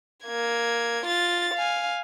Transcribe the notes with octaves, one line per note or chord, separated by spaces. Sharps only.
A#3 G#6
F4 A6
F5 G#5